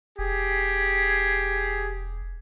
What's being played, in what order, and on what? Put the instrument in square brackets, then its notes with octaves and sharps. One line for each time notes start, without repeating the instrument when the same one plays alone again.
[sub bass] E1 [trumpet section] G4 G#4